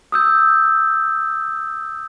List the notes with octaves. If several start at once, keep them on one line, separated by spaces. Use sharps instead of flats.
D#6 E6 G6